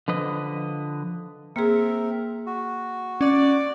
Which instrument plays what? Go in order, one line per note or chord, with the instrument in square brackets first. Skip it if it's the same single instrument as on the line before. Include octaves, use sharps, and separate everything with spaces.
[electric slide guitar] D3 F3 B4 D#5
[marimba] A#3 G#4 [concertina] C4 A#4 E5
[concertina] F#4
[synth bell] C#4 [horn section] D5